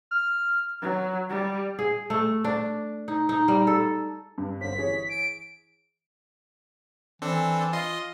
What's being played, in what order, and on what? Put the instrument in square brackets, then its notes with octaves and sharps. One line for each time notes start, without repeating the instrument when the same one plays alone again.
[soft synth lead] F6
[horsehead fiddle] F#3
G3
[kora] G#4
A3
D4
D#4
D#4
G3
A4
[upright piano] G2
[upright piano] G1 C5 [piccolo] B6
[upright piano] E3 G#4 C#5
[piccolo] D7
[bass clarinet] E3 [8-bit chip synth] C4 D4 A4
[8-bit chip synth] F4 D#5 C6